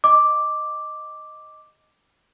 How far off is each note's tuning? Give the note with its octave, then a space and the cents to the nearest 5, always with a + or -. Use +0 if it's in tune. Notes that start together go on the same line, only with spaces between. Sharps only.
D#5 +0 D6 +0